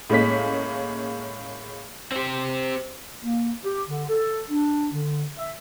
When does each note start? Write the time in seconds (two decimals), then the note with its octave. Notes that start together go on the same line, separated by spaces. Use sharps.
0.10 A2 G#3 A#3 C#4 B6
2.12 C4 G4
3.24 A#3
3.65 G4
3.88 D3
4.10 A4
4.50 D4
4.92 D3
5.38 E5